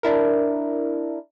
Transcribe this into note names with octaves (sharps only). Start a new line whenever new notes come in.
D4 E4 A#4